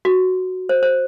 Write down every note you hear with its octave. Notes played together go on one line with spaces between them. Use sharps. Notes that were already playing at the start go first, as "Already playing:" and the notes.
F#4
C5
C5